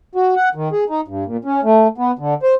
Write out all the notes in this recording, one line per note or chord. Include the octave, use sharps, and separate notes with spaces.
F#4
F#5
D#3
G#4
D#4
G2
A#2
C#4
A3
B3
D3
C5